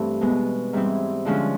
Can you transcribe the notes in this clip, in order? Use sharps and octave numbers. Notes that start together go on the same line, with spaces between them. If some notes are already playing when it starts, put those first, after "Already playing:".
Already playing: G2 E3 A3 C4
B2 G#3 B3
G#2 E3 G3 C4 E4
D3 F3 G#3 C#4